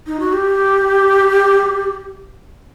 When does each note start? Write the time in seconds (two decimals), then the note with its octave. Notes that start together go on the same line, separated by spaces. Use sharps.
0.07 D#4
0.20 F#4
0.33 G4